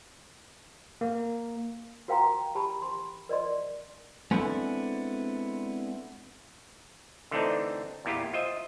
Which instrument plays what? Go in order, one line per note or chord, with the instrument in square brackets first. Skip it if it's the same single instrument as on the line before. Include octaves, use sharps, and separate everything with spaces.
[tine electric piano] A#3
[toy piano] F#4 A#4 F5 G5 A#5 C6
G4 A5 B5
C6
A#4 D5 D#5 C6
[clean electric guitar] G#3 B3 C4 D4 E4 A4
[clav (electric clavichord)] D3 E3 A3 C4 D4 D#4
E2 A#2 E4 F4 G4
F4 C5 D#5 E5